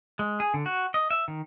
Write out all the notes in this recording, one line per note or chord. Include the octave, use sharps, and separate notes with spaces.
G#3
G#4
D3
F#4
D#5
E5
D#3